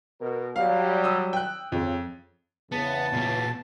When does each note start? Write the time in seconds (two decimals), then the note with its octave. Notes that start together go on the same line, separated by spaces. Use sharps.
0.20 B2 A#4
0.56 F#3 G3 F5
1.04 D#6 E6
1.33 G5 F#6
1.72 F2 C#3
2.72 E2 C#3 B3 A5
3.13 A#2 B3